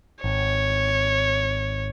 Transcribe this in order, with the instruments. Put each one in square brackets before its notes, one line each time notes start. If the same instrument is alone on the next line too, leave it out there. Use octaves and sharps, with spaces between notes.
[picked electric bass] G#1 [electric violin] C#5